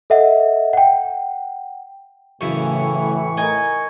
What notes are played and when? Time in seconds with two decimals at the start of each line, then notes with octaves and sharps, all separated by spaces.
0.10 A4 D#5 E5 F#5
0.73 F#5 G5
2.41 F#2 A2 C#3 E3 E4 C#6
3.37 D#4 A#4 G#5